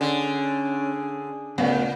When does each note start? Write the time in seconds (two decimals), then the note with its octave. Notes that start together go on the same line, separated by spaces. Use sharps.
0.01 D3 C#4 G#4
1.58 D2 A#2 C#3 B3 F5